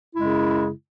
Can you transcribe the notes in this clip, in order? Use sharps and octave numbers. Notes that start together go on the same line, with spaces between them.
F#2 C#3 G#3 E4